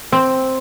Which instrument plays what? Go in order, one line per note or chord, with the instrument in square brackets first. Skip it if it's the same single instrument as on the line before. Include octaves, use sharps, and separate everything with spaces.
[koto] C4